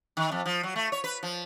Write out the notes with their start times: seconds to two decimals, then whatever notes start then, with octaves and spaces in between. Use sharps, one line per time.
0.17 D#3
0.32 F2
0.46 F3
0.63 F#3
0.76 A3
0.92 C#5
1.04 B4
1.23 F3